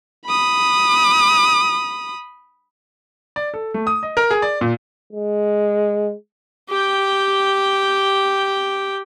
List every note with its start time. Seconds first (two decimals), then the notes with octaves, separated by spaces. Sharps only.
0.26 B5 D#6
3.36 D5
3.54 A4
3.74 A3
3.87 D#6
4.03 D#5
4.17 A#4
4.31 G#4
4.42 D5
4.61 A#2
5.13 G#3
6.69 G4 G5